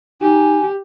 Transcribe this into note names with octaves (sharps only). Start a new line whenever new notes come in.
D#4 G4 G#5